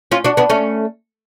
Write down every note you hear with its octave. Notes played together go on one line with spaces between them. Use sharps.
C#4 F4
D4 F#4
B3 D4
A3 C#4